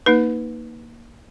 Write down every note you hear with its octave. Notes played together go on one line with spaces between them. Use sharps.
A#3 D#4 B4